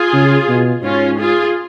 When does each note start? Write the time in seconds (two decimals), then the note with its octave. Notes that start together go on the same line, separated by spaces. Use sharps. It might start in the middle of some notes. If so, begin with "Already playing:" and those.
Already playing: F4 G#4
0.13 C#3
0.48 B2
0.83 G#2 C#4 F4
1.19 F4 G#4